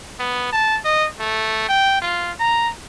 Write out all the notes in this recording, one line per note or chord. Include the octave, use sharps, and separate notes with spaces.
B3
A5
D#5
A3
G5
F4
A#5